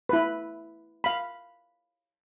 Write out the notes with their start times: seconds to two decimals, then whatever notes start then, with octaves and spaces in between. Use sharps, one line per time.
0.09 E4 B4
1.04 F5 B5